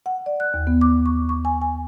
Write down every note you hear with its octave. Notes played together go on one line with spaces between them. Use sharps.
F#5
D5
F#6
D#2
B3
D6
C#6
C#6
G#5
G#5